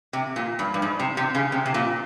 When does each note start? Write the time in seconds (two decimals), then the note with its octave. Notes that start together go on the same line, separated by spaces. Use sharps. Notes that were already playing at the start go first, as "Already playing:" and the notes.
0.13 C3
0.36 A#2
0.59 G2
0.74 G2
0.82 G#2
1.00 C3
1.17 C3
1.35 C#3
1.52 C3
1.66 C3
1.74 A#2